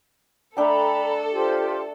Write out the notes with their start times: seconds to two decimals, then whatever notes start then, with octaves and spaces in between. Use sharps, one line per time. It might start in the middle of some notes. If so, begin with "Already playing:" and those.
0.57 A3 D4 A4 G5 A#5 B5
1.31 F4 G4 C5